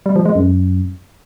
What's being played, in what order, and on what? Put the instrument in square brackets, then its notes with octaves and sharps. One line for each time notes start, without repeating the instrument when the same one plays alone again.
[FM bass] G3
F3
G#3
F#2